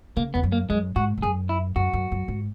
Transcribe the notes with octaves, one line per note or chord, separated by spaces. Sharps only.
C#3 A#3
E2 B3
F#2
A#3
F#2 G#3
G#2 F#4
G#2
F#2 G#4
E4
F#2 F#4
F#2
F#2
G#2